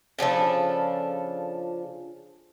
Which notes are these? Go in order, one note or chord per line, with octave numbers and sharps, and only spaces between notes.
C#3 F3 D4 A4